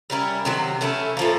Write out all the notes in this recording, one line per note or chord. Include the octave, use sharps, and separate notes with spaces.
G3 A#3 C#4 E4
C3 D#3 F#3 A#3
E3 A3 C#4 E4
A2 F3 A#3